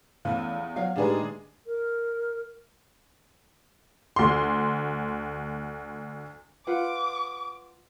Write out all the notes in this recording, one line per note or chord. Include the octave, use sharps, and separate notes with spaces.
E2 E3 A3 C#4 F5
F#3 C#5 F5
A2 D#3 G#3 D4 D#4 G4 G#4 B4
A#4
D2 C6
F4 B4 F#5 D6